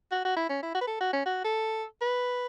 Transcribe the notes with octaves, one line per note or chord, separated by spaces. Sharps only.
F#4
F#4
E4
C#4
E4
F#4
B4
A4
F#4
C#4
F#4
A4
B4